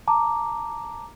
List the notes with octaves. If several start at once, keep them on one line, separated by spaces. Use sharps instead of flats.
A5 A#5 D6